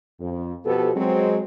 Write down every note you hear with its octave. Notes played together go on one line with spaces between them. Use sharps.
F2
B2 F3 B3 G4 A4
F#3 G#3 C4